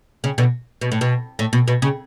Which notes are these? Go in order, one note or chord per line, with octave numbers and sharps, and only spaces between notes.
C#3
B2 D3
B2
A2
B2
A2
B2
B2
C#3